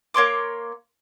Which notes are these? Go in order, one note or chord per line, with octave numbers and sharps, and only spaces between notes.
A#3 C#5 C6 D6